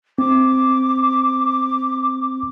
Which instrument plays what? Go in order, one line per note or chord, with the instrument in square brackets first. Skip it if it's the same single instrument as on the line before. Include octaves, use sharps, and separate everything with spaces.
[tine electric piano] C4 [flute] D6